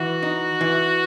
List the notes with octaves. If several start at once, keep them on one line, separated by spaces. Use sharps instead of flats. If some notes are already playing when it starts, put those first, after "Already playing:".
Already playing: E3 F#4
D#4
E3